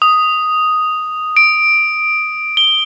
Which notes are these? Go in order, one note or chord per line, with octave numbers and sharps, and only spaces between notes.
D#6
D7
G7